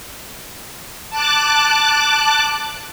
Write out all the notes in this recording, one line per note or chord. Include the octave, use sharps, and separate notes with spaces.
A5 D6 F#6